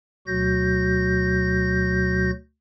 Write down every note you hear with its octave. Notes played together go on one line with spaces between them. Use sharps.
D2 B2 F#3 F#4 G6 A#6